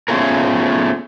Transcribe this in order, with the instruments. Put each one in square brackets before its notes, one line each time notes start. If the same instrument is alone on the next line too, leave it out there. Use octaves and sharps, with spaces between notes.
[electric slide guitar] A3 B3 C#4 F4 G#4 A#4